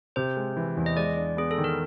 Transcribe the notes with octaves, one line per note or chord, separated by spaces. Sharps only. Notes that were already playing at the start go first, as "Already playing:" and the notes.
C3 C5
G#3
E3
E2
D#5
G#3 D5
D4
B3 G#4
A4
D#3
A#4